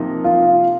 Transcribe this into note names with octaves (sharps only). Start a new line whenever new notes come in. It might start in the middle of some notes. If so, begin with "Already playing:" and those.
Already playing: C3 F3 A#3 D#4
F4